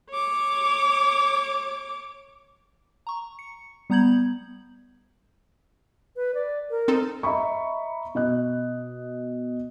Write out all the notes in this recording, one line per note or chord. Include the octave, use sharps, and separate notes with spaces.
C#5 D6
A#5 C#6
C#7
G3 B3 A#5 G6 G#6 F#7
B4
D5
A#4
C4 D#4 A4
D#5 E5 A#5 B5 C#6
B2 D#5 F#6